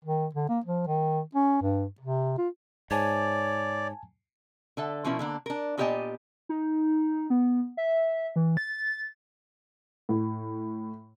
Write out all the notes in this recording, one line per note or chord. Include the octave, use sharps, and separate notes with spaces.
D#3
D3
A#3
F3
D#3
C#4
G2
C3
F4
G#2 C#5 D5 G#5 A5 G#6
D3 A4 E5
B2 F3 C#4 E4 A#4
D3 A#3 D4
D4 A#4
A#2 B3 G4 D5 D#5 G#5
D#4
B3
E5
E3
A6
A2